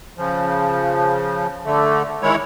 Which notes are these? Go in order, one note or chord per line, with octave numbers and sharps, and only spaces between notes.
C#3 F3
D3 A3
D#3 G#3 E4 C#5